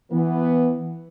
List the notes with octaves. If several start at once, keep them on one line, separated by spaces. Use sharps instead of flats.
E3 B3